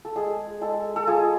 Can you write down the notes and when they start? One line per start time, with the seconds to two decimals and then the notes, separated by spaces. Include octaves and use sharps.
0.05 A4
0.16 G#3 G#4
0.61 G#3 A4
0.96 A4
1.07 F4 G#4